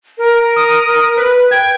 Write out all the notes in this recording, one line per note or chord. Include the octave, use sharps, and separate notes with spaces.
A#4
D#6
B4
G5 G#6